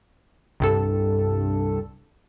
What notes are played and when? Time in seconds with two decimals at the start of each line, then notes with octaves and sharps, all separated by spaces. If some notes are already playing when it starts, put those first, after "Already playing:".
0.60 C2 G2 A4